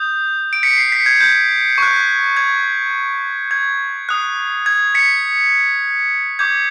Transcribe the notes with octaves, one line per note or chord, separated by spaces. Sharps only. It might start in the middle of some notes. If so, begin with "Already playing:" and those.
Already playing: D#6 G6
D7
B6 C#7
C7
B6
G#6
G6
C#6 F#6
G#6
G#6
D#6 F#6
G#6
B6 C#7
D6 G6 G#6